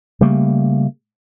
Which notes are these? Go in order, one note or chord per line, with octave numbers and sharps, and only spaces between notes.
C#3 G3 A3 A#3